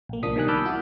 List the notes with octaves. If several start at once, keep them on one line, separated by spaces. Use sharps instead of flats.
A#1 A#3
C2 F3 A#3 D4 D#6 B6
B2 D#3 G3 G#5 F#6
A5 B5 D6 E6 F6 G6
E4 F#4